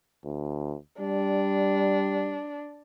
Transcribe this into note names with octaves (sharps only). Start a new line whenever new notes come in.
D2
G3 D4